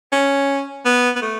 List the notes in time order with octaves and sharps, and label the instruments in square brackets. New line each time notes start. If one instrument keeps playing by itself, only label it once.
[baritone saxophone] C#4
B3
B3
A3